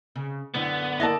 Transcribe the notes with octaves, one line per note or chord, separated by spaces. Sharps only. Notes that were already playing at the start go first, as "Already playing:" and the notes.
C#3
F#2 A2 D3 B3
A#3 E4 A4 D5 D#5